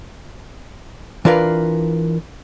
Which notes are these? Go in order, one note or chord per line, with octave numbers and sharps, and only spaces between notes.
E3 D4 F4 A#4 B4 F5